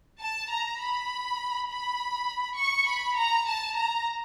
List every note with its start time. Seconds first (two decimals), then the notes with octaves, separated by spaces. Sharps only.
0.20 A5
0.50 A#5
0.80 B5
1.69 B5
2.58 C#6
2.88 B5
3.17 A#5
3.47 A5
3.76 A#5